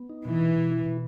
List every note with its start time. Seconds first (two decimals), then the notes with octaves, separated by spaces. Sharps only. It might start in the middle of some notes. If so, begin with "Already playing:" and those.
Already playing: B3
0.09 D#4
0.25 B2 E3
0.40 B2
0.56 B2
0.71 E4
0.86 B2